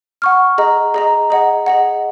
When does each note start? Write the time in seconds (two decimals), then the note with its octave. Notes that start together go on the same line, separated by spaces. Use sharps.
0.22 F#5 C#6 F6
0.58 G#4 D#5 A#5
0.94 G#4 D#5 A#5
1.30 G#4 D#5 F#5
1.66 G#4 D#5 F#5